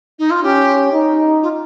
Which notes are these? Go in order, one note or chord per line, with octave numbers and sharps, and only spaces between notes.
D#4
F4
C#4 G4
D#4
F4